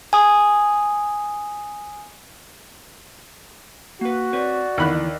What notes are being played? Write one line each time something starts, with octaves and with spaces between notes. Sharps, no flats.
G#5 D#6
A#3 F#4 B4
C4 B4 C#5 D5
D#2 D3 E3 B3 B5 F#6